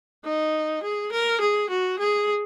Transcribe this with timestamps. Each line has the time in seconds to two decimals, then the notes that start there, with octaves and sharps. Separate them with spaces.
0.25 D#4
0.83 G#4
1.12 A#4
1.41 G#4
1.69 F#4
1.99 G#4